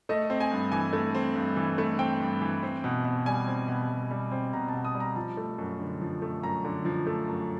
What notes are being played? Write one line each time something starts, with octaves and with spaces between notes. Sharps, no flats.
A3 D#5
C4
G#5
G2
E3 G#5
A3
C4
G2
E3
A3
C4 G5
G2
E3
C4
B2
B2
G3 G#5
C4
B2
B2
G3
C4
B2 A#5
A5
B2
D#6
G3
A#5
F3 A5
A3
F#2
D3
F3
A3
F#2 A#5
D3
F3
A3
F#2